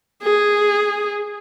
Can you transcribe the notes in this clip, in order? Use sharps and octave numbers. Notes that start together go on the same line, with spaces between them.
G#4